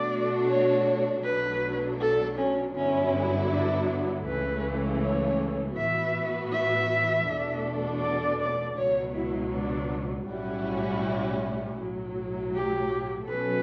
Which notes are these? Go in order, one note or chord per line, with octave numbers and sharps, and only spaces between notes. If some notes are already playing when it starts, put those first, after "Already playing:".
Already playing: B2 A3 D4 F#4 D5
C#5
B1 B2 F#3 A3 D4 B4
A4
C#4
G2 D3 F#3 B3 C#4 E4
D4
C#2 C#3 E3 A3 B4
C#5
A2 E3 B3 F#4 B4 E5
E5
E2 B2 A3 D4 A4
D5
D5
C#2 B2 F#3 C#5
E4
D4
B1 A2 G3 C#4 E4 F#4
B1 A2 F#3
G4
B2 F#3 C#4 F#4 A4 B4